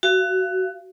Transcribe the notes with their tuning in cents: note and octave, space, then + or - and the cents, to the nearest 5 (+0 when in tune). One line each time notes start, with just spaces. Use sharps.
F#4 +15 F5 -30